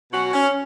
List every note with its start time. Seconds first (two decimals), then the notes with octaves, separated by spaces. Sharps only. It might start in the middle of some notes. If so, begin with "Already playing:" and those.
0.12 B2 F#3 C#4 F#4
0.33 C#4